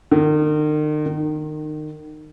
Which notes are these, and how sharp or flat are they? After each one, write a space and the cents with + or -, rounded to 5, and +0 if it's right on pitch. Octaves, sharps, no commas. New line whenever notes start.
D#3 -40
D#3 -25